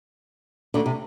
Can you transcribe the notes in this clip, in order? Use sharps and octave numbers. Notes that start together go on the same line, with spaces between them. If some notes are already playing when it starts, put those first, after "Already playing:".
D2 D3
C3